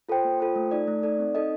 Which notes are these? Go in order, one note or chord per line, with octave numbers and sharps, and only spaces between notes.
F4 A4 C5 G5
A#3
F4 A4 C5 G5
A3
D#4 A4 D5
A3
D#4 A4 D5
C4
D#4 A4 D#5